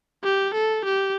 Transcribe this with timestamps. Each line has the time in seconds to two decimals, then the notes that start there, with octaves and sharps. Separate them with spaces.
0.24 G4
0.54 A4
0.85 G4